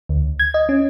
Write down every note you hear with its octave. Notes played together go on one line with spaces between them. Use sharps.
D2
G#6
D#5
C#4